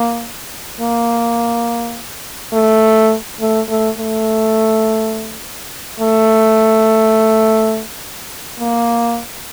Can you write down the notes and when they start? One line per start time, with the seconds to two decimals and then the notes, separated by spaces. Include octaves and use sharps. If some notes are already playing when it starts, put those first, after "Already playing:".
Already playing: A#3
0.81 A#3
2.53 A3
3.40 A3
3.69 A3
3.98 A3
6.00 A3
8.60 A#3